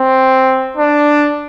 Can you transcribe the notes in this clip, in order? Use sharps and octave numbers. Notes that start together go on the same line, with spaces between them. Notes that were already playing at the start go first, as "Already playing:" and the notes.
Already playing: C4
D4